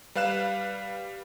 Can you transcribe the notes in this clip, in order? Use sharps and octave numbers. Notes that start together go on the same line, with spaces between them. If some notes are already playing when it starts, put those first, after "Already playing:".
G3 B4 F5 F#6 E7